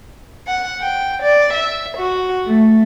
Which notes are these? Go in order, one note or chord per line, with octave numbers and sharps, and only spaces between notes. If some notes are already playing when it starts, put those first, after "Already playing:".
F#5
G5
D5
E5
F#4
A3